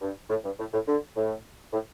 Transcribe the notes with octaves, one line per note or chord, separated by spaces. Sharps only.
G2
A2
G2
A2
A2
D3
A2
A2